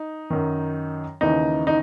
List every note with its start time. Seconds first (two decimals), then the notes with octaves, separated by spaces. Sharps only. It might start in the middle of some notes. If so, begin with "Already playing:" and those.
Already playing: D#4
0.30 F#2 D#3
1.21 D#2 C#3 E3 D#4
1.67 D#4